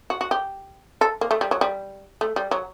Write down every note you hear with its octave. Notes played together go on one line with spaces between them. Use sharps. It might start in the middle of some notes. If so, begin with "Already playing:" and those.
F#4
F#4
G4
A4
A#3
A3
G3
F#3
G3
A3
G3
F#3